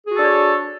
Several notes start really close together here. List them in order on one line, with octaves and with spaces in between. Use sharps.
G#4 F#4 A4 D4 C#5